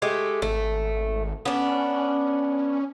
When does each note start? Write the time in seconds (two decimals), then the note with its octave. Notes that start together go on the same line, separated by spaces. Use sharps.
0.02 G#3 A3 G4
0.42 G#1 A3
1.45 B3 C#4 D4